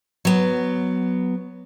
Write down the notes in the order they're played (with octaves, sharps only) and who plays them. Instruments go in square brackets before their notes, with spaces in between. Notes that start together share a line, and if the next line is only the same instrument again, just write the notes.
[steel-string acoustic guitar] F#3 B3